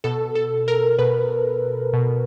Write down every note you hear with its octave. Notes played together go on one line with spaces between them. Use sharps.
B2 A4
A4
A#4
B2 B4
B2